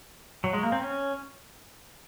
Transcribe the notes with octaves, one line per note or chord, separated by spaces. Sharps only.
F#3
G#3
A#3
C4
C#4